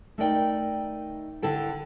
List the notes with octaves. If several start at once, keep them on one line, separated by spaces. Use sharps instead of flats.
A3 D#4 A#4 D5 G5
D3 E4 A4 G5